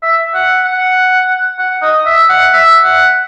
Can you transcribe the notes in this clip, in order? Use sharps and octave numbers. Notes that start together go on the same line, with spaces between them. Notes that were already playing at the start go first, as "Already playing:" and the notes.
E5
F#5
F#5
F#5
D#5
E5
F#5
E5
F#5